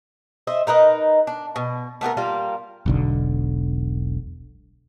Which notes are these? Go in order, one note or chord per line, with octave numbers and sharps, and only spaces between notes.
C5 D#5 E5
D#4 A#4 B4 D#5
D4
B2
A3 B3 G4 A#4
G3 A#3 F4
E1 B1 D3